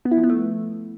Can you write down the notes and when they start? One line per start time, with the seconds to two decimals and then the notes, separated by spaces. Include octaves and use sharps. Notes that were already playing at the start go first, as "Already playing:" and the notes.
0.05 B3
0.11 E4
0.17 F3
0.24 B3
0.30 A3